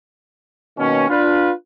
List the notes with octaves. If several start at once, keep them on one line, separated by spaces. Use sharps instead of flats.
B2 D#3 A#3 B3 C#4
D4 F4 B4